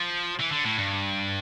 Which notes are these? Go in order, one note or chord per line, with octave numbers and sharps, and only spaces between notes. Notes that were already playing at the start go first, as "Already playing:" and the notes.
Already playing: F3
E3
D3
A2
G2